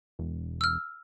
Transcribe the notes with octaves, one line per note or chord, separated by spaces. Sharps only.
E1
E6 F6